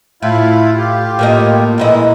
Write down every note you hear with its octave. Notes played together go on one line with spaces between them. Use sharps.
A2 E4 F4
F4 G4
A2 A#3 D#5
A#2 E3 G#3 A#3 E4 D#5